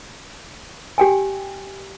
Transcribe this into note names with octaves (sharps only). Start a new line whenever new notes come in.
G4 G5 G#5